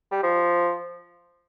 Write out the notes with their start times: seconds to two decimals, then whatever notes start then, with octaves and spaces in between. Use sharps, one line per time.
0.12 G3
0.23 F3